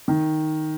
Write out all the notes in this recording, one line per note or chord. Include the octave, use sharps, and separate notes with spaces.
D#3